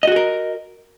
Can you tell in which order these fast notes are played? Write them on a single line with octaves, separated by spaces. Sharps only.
D#5 F#4 G#4 A#4